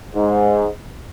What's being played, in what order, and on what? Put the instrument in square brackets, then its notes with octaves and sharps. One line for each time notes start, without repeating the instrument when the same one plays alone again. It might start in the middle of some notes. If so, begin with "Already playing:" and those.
[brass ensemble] G#2